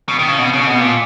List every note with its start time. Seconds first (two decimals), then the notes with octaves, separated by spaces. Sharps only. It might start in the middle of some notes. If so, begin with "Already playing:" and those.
0.08 B2
0.19 D#3
0.28 C#3
0.39 B2
0.53 C#3
0.67 B2
0.80 A#2